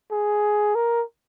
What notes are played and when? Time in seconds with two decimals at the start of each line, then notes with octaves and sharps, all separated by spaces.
0.12 G#4
0.75 A#4